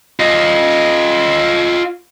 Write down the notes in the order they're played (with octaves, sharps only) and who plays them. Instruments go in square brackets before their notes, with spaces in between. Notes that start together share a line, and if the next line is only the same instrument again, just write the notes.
[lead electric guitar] F4 D#5